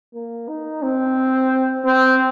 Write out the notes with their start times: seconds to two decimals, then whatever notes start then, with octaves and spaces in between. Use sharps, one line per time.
0.14 A#3
0.48 D#4
0.82 C4
1.85 C4